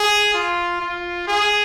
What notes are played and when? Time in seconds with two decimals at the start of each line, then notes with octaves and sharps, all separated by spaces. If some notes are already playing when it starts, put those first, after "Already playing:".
Already playing: G#4
0.34 F4
0.81 F4
1.28 G#4